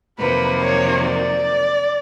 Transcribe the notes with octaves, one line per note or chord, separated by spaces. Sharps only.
F2 C3 D#3 F#3 A#3 B4
C#5
D5